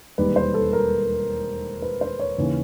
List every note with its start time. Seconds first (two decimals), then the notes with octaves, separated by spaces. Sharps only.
0.18 E1 D#2 D#3 G3 B4
0.36 C5
0.54 A4
0.73 A#4
1.82 B4
2.01 C5
2.19 C#5
2.38 D#2 C#3 E3